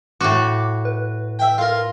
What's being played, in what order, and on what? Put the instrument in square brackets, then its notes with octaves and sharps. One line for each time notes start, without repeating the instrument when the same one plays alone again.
[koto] A2 F#4 [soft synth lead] D6
[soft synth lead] B4
[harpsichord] E5 G5
F4 A#4